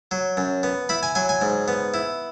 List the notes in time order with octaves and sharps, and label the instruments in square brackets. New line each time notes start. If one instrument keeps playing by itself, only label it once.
[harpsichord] F#3
F#2
B3
E4 B5
G#5
F#3 G#5
G#5
G#2
B3
E4